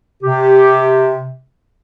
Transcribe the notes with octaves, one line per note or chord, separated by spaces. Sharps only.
C3 G4